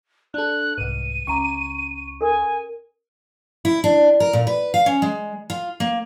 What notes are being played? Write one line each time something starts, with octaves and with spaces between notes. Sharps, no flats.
D4 A4 F#6
C2 G#2 B4 D#7
C#2 C#4 A#5 C#6 D6
A4 A#4 G#5
E4
D4
A#4
A#2
B4
F5
C#4
G#3
F4
A#3